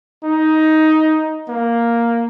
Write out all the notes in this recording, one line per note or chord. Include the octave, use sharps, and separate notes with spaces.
D#4
A#3